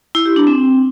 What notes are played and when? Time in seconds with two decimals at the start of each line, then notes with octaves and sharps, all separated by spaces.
0.15 E4
0.26 G4
0.36 D4
0.47 C4